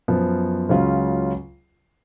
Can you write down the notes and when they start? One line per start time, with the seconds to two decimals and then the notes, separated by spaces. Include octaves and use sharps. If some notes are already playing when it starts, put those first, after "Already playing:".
0.08 F#2 F3 B3
0.69 C#2 C#3 F#3 C#4 F4